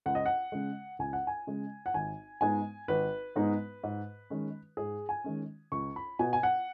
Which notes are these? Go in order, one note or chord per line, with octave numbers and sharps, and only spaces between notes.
C#2 F#5
D#5
F#5
C#3 G#3
C#2 G#5
F#5
G#5
C#3 G#3
F#5
G#1 G#5
G#2 G#3 B3 D#4 G#5
G#1 B4
G#2 G#3 B3 D#4
G#2
D#3 G#3 C#4
G#2 G#4
G#5
D#3 G#3 C#4
C#2 C#6
B5
B2 B3 G#5
G#5
F#5